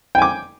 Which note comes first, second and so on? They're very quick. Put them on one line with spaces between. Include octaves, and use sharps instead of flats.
G5 G#5 D6